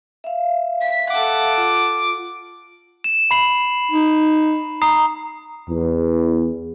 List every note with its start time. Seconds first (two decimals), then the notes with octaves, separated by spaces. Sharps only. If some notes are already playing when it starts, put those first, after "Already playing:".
0.24 E5 F5
0.81 B6
1.10 A4 F#5 D6
1.58 F4
3.04 E7
3.31 B5 C7 F#7
3.92 D#4
4.82 A#5 D#6 C7
5.69 E2